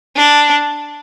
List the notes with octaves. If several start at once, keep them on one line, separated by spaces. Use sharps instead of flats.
D4